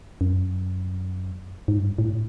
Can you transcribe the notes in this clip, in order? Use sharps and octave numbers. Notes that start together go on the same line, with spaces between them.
F#2
G#2
G2
A2